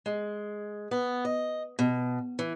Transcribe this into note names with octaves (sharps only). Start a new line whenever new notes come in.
G#3
B3
D#5
B2
E3